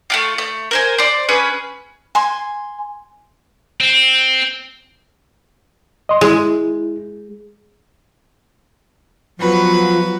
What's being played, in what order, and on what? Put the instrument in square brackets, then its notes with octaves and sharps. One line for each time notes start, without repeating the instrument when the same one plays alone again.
[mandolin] A3 A#3 F4
A3
A#4 C5 G#5
C5 D5
C#4 G#4 B4
[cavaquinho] G#5 C6
[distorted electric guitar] C4
[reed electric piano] D#5 C6
[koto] G#3 [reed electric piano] E4
[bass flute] F3 [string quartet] F#3 B3 B4